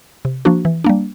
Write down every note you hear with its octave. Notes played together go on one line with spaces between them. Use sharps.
C3
F3 A#3 D4 F#4
E3
G3 A#3 D4